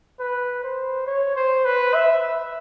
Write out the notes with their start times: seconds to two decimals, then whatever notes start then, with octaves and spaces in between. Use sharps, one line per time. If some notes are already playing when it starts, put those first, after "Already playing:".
0.20 B4
0.63 C5
1.07 C#5
1.36 C5
1.65 B4
1.94 E5